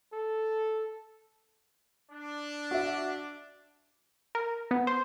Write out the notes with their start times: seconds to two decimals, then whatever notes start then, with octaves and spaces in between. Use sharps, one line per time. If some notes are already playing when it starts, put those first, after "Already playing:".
0.13 A4
2.12 D4
2.71 F#4 E5
4.35 A#4
4.71 B3
4.87 C5